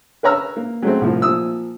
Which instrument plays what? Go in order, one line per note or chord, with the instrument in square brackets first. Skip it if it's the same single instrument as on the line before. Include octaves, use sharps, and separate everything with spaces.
[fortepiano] A#4 B4 C#5 A#5 E6 F6
A#3
F#3 G#3 A3 C4
C2 A2 F3
A#2 F3 D#6 E6